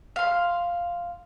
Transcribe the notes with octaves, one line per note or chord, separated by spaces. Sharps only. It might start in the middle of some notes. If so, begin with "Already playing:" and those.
F5 C6